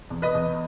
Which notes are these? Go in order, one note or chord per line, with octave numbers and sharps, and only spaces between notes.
E2
B4 D#5
E2